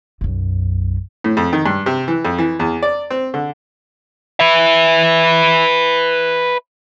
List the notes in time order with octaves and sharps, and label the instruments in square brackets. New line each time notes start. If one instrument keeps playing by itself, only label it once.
[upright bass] B1 F#2
[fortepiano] A2
F2
D#3
G2
C3
E3
F2
E3
E2
D5
C4
D3
[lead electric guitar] B4 E5